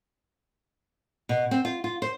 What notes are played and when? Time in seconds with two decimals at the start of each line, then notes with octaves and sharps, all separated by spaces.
1.29 B2
1.51 C4
1.65 F4
1.84 F4
2.02 C5